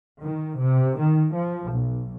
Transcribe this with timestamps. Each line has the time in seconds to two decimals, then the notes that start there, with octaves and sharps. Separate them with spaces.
0.20 D#3
0.59 C3
0.98 D#3
1.32 F3
1.68 B1